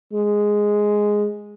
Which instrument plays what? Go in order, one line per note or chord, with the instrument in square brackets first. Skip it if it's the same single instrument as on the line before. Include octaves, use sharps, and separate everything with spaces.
[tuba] G#3